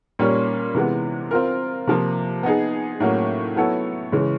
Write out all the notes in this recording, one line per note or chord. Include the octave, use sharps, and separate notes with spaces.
A#2 G3 A#3 C#4
C3 E3 G#3 B3
C4 F4 A#4
C3 F3 A#3
B3 D#4 G#4
A2 F#3 A#3 C#4
F#3 B3 E4 A4 C#5
C#3 E3 G#3 C#4